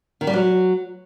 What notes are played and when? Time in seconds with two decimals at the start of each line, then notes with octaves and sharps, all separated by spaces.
0.21 D#3
0.27 G3
0.33 F#3